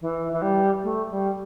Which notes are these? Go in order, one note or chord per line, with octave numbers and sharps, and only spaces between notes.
E3
E3
G3
A3
G3